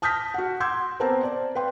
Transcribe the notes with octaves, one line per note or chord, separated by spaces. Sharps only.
A5 D#6 F6 G6 A#6 B6
F#4 F#5
F#5 C6 D6 E6 G6 G#6
B3 C4 A#4 C5 A5 A#5
D5
B4 F5 G5 C6